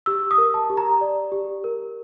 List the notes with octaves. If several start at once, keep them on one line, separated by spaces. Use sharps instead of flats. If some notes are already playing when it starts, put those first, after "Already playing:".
G4 E6
D#6
A#4
A5
G4
A#5
D5
G4
A#4